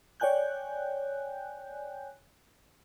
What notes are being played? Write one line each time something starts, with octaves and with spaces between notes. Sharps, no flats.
C#5 D5 G5 G#5 F#6 G6